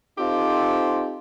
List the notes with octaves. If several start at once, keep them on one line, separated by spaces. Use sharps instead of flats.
C4 D#4 F4 G4 A4 C5